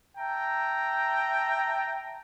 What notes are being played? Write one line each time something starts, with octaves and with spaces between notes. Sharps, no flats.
E5 G5 A5 A#5